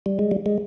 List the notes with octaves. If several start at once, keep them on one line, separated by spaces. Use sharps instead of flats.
G3
G#3
G3
G#3